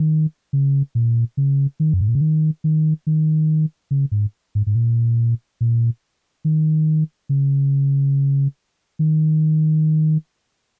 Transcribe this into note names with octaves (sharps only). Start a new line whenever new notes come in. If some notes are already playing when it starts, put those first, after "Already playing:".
Already playing: D#3
C#3
A#2
C#3
D#3
F#2
G#2
A#2
C#3
D#3
D#3
D#3
C#3
G#2
G#2
G#2
A#2
A#2
D#3
C#3
D#3